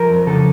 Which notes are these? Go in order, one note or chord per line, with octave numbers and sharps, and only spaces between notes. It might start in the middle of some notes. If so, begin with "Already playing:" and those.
Already playing: F3 A#4
F2
C#3 A4